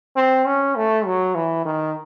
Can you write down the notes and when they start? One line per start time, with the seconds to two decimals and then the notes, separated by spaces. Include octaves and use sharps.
0.16 C4
0.45 C#4
0.76 A3
1.06 F#3
1.35 E3
1.65 D#3